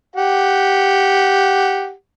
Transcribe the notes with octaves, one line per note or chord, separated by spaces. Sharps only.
G4 F#5